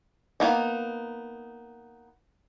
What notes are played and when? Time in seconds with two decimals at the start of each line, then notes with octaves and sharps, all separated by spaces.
0.40 A#3 B3 D#4